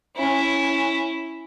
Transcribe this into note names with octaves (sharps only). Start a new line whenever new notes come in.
C#4 E4